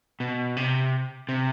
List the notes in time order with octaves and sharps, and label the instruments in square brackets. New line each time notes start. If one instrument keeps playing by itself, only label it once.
[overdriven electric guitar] B2
C3
C3